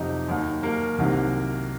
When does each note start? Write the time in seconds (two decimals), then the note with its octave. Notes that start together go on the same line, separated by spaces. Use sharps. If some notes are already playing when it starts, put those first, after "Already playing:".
Already playing: F2 C3 F#3 D#4
0.28 D#2 D#3 F#3
0.63 A#3
0.98 C2 C3 D#3 F#3